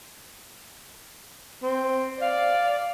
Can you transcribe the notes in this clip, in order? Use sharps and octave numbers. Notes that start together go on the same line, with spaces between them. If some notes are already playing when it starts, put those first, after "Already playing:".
C4
D5 F5